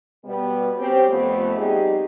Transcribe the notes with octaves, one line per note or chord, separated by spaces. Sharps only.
B2 G3 B3
C4 C#4 G4
F2 A3 B3
G3 C4 D#4 G4 G#4